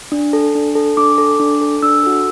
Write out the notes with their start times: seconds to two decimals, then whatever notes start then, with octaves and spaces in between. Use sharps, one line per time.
0.12 D4
0.33 A4
0.55 D4
0.75 A4
0.97 D4 D6
1.18 A4
1.40 D4
1.61 A4
1.83 D4 E6
2.03 F#4 A4